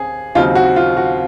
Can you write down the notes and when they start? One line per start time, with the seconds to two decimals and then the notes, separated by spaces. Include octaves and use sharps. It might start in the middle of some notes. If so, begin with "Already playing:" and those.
Already playing: D#2 C4 G#4
0.35 D#2 C#3 F#3 C4 D#4 F4
0.55 F#4
0.76 F4
0.97 F#4